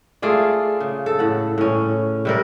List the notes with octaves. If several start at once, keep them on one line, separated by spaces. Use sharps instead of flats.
A3 F4 G#4 D5
C#3
A4
A2 F#5
A2 C#4
C3 G3 A#4